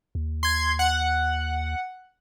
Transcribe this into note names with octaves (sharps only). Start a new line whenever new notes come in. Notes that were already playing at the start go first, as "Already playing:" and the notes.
D#2
C6 G#6
F#5